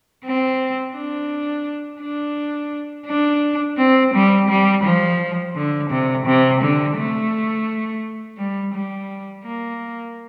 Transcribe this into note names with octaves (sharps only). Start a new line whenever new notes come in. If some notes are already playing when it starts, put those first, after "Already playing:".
C4
D4
D4
D4
C4
G3
G3
F3
D3
C3
C3
D3
A3
G3
G3
A#3